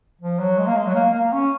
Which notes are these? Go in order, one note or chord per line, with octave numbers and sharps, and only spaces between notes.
F3
F#3
G#3
A#3
G#3
F#3
A#3
A#3
C#4